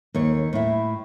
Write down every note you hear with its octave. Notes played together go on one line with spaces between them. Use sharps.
D#2 C#5
A2 E4